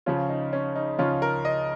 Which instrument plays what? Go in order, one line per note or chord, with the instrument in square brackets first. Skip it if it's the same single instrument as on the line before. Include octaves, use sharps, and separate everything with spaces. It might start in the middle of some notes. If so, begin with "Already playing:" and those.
[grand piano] C#3 F3 C#4 F4
D#4
C#4
D#4
C#3 F3 C#4 F4
A#4
D#5